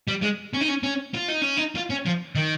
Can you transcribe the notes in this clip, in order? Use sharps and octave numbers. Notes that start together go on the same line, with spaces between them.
G3
G#3
C#4
D#4
C#4
C#4
F4
D#4
C#4
D#4
F4
C#4
F3
D#3